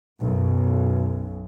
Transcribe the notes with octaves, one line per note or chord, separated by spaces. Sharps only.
B1 F#2